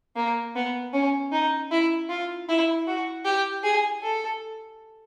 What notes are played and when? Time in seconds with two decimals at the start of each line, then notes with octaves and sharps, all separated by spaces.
0.16 A#3
0.55 B3
0.93 C#4
1.32 D#4
1.71 E4
2.09 F4
2.49 E4
2.87 F#4
3.25 G4
3.63 G#4
4.03 A4